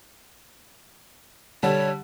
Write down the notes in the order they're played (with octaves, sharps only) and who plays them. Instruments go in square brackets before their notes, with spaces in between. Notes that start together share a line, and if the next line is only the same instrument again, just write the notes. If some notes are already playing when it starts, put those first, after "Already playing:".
[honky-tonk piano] D3 G3 A5 [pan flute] C#5